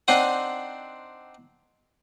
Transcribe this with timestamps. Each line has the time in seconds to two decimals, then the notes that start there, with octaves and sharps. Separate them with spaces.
0.08 C4 D4 D#4 C5 F#5